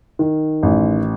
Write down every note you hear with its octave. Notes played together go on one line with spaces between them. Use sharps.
D#3
A1